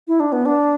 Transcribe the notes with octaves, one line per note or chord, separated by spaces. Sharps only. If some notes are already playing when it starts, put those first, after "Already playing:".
E4
D4
B3
D4